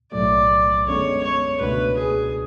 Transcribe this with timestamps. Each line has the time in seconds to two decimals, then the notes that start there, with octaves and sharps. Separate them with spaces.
0.12 B1 A2 F#3 A3 D5
0.86 F#2 D3 G#3 B3 C#5
1.23 C#5
1.60 C#2 B2 A3 D4 F#4 B4
1.97 G#4